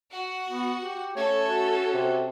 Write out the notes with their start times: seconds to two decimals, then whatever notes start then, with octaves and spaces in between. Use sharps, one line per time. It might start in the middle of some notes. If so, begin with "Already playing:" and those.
0.11 F#4 F#5
0.48 B3
0.81 G4
1.16 A3 C#4 A4 C#5
1.49 F#4
1.94 C3